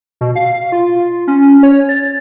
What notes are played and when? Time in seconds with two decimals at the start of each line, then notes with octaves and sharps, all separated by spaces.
0.21 B2
0.36 F5
0.72 F4
1.27 C#4
1.63 C#5
1.89 A6